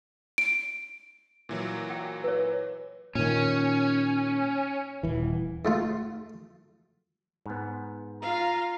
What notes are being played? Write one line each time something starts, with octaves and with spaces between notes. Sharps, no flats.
D7
A#2 E3 F#3
G5
B4 C#5
A#2 D#3 C#4
D#1 E3
G#2 A3 F4
G#2 B3
F4 F5 A#5